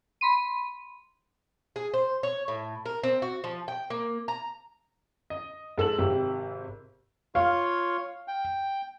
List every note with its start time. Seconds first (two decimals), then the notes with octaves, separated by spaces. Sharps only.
0.21 B5 C6 D#7
1.76 G#4
1.94 C5
2.23 C#5
2.48 A2
2.85 A#4
3.03 C4
3.22 F#4
3.44 F3
3.68 G5
3.90 A#3
4.28 A#5
5.30 D#5
5.78 G#2 A4 E6 F#7
5.99 G#1 C3 G4
7.35 F4 C#5 F5
8.28 G5